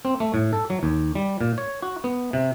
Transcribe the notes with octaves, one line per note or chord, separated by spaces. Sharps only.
C4
A3
A2
A4
F#3
D#2
G3
A#2
C#5
F#4
B3
C3